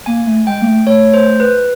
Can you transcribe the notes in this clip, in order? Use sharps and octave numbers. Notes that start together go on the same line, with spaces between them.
A#3 G#5
A3
G#3 G5
A#3
A3
A3 C#5
C5
B4